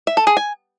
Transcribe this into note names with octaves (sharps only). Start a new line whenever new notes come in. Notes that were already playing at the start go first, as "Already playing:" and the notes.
E5
A4
G#4
G#5